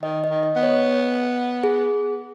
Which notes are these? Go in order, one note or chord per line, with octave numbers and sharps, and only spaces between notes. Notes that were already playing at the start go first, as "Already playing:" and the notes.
D#3 D#5
D#5
D#3
D#5
B3
C#5
G#4